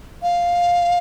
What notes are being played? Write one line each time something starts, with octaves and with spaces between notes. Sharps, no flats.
F5